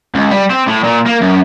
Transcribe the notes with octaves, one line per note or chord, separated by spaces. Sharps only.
C#2
G3
C4
A2
A#2
A#3
F#2